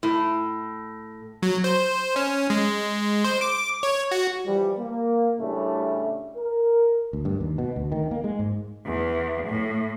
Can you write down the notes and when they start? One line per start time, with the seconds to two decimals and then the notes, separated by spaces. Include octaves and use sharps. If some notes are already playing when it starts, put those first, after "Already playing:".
0.03 A2
1.43 F#3
1.64 C5
2.16 C#4
2.50 G#3
3.24 C5
3.41 D6
3.83 C#5
4.11 F#4
4.46 E3 F3 G3
4.78 A#3
5.40 A2 C#3 G3 A3 D4
6.36 A#4
7.13 D2
7.25 G2
7.40 D#2
7.58 B2
7.76 D2
7.92 D#3
8.11 A#3
8.24 G#3
8.39 G#2
8.86 E2
9.46 A2